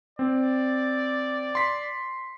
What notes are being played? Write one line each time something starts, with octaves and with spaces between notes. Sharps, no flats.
C4 D5
C6 B6